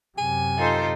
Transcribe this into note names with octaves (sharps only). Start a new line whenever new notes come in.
F#2 C3 G#5
D#4 F4 A4 C5